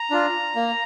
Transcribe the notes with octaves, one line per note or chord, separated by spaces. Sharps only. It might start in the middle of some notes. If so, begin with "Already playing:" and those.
Already playing: A#5
D4 F4
A#3